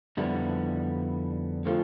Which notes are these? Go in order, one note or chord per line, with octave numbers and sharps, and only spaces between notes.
F2 D3 G3 B3 E4
D3 F3 A3 C4 F4